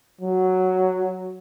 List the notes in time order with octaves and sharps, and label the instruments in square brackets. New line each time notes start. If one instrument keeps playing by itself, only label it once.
[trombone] F#3